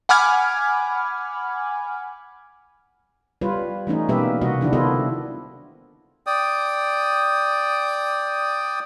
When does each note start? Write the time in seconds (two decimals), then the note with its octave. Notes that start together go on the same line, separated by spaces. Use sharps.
0.09 F#5 G#5 B5 D6 F6 G#6
3.41 G3 F4 B4 C#5
3.87 E3 A3 C#4 D#4
4.09 B2 G3 A#3 G4 B4 E5
4.41 C3 G3 F#4 D#5
4.61 D3 D#3 F3 D4 E4
4.73 B3 E4 F4 G4 A4 D#5
6.27 D5 G5 D#6